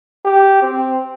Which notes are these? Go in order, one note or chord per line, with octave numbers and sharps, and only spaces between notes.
G4
C4